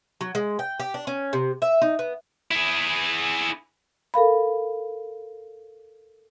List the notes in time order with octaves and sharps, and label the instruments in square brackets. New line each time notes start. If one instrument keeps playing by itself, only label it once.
[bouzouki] F#3
G#3
G5
G4
D4
C#4
C3
E5
D#4
B3
[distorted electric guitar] E4 G#4
[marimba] A4 A#4 F5 B5